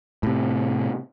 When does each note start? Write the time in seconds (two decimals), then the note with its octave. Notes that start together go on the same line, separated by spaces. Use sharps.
0.23 A2 C3